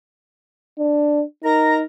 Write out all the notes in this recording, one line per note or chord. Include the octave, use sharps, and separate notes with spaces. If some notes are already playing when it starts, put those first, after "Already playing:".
D4
D#4 A#4 A#5